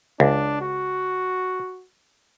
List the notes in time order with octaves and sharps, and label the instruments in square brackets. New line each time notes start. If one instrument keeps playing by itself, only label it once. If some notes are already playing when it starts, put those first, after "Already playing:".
[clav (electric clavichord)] C#2 [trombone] D4
[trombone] F#4